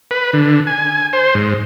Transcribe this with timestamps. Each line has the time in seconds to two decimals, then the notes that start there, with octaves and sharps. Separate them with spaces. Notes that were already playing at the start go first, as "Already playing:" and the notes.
0.11 B4
0.33 D3
0.67 G#5
1.13 C5
1.35 G#2